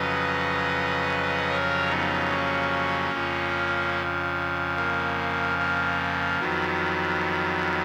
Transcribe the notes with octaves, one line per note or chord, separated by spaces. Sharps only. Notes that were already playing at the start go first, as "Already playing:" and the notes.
Already playing: F2 C#3 F#3 B4 D#5
A#4 C#5
B3 D#4
A#3 C#4
F2 C#3 F3
A#3
A#3
F2 D#3 F#3 B3